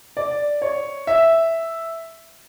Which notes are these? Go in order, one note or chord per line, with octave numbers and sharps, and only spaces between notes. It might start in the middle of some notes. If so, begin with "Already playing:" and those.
D5
C#5
E5